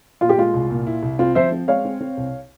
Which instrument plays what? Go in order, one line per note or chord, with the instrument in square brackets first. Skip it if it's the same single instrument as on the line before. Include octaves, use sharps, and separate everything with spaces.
[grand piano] A#2 [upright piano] F4
[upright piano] G4
[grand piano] G#3 [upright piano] F4
[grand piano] C2
A#2
E4
C2
[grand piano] C4 [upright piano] F4
[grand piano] F3 [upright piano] C5 E5
[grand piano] C4
[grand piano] G#3 [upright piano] C#5 F5
[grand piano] C4
C4
C2